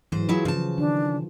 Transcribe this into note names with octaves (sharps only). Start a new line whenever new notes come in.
G#2 E3 F#3 C5
F#3 E4 F4 G#4
C#3 F3 A5
D#3 D4